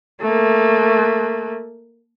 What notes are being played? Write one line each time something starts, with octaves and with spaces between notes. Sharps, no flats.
A3 A#3